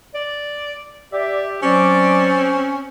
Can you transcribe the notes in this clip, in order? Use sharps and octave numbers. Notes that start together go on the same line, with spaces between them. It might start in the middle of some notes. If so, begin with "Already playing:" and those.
D5
G4 D5 E5
F#3 C4 C#4 D5